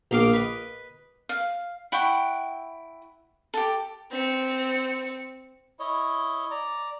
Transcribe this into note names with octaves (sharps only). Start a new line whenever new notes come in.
A#1 A#3 D#5 F5 D6
B4 D#5
F5
E4 F#5 G5 C#6
G4 A4
C4 C#7
E4 C#5 D#5
D5 A#5